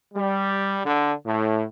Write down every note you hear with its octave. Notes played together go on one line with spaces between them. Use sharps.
G3
D3
A2